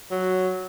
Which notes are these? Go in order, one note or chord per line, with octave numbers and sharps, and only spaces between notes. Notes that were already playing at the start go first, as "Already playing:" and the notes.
F#3